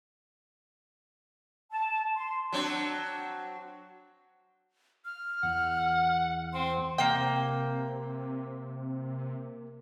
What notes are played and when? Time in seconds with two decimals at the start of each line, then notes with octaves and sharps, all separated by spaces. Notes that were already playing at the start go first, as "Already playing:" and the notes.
1.71 A5
2.14 C6
2.52 F#3 C4 D4
5.05 F6
5.43 E2 F#5
6.53 C4 C6
6.98 C3 A#3 G5